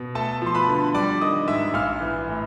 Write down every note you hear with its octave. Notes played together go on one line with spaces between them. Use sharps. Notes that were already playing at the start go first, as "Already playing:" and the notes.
Already playing: B2
A3 A4 A5
F3 C6
B4 B5
D3
G3 D5 D6
D#3 D#5 D#6
G#2 E5 E6
A#1 F5 F6
E3
A2